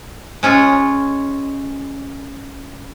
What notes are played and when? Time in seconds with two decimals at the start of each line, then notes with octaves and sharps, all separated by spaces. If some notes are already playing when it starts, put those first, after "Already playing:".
0.43 G#3 C#4 F4